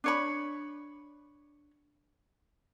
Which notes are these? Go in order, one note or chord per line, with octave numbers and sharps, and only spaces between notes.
D4 C#5 B5